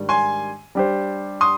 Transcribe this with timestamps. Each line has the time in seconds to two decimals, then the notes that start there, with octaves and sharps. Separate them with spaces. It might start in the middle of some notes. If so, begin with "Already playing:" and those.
Already playing: G#2 D#3 G3 D4
0.09 G#5 C6
0.75 G3 D4 G4 C5
1.41 C6 D#6